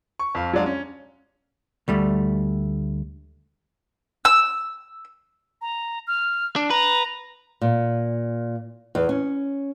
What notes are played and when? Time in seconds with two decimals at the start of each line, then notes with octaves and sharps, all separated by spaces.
0.19 C#6
0.35 F2 F5
0.53 F#3 G#3 D4 D5 F5
0.66 C#4
1.88 D2 G3 A3
4.25 E6
5.62 A#5
6.07 F6
6.56 D4
6.70 B4 A#5
7.61 A#2
8.95 E2
9.09 C#4